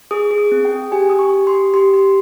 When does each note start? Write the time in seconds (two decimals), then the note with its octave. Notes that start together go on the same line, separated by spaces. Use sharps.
0.11 G#4 D#6
0.31 G#4
0.38 D#6
0.52 C4
0.65 G5
0.72 G#4
0.92 G4 G#5
1.10 G4 D#6
1.19 C#6
1.33 G4
1.47 C6
1.54 G4
1.74 G4 C6
1.94 G4